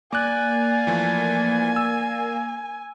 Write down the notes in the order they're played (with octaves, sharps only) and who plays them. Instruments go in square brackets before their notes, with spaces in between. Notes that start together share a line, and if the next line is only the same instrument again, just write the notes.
[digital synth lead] A#3 [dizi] D5 [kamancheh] G#5 [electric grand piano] D6 F#6
[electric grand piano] E3 F3 A3
E6